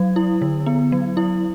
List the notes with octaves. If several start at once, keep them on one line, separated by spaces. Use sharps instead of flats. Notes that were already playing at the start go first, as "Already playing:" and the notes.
Already playing: F#3
E4
D3
B3
F#3
E4